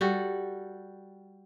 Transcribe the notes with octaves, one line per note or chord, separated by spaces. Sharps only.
G3 F#4 A4